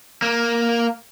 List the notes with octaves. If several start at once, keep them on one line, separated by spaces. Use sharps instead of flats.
A#3